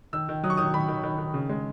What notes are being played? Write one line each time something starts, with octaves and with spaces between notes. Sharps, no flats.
D#3 E6
D#3
F#3 D#6
C#6
D#3 D#6
D#3 B5
D#3
D#3
D#3
C#3
G#3